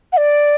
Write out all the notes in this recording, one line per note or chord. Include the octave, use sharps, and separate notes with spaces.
F#5
D5